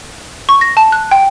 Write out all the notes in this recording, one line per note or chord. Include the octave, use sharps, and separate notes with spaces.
C#6
A#6
A5
F#6
G5